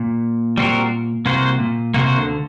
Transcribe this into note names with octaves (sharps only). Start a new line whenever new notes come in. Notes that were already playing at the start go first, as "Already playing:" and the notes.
Already playing: A#2
G3 C4 F#4 A#4
C2 C3 A#3 F#4 C5
A#2
C2 C3 A#3 F#4 C5
D2 D3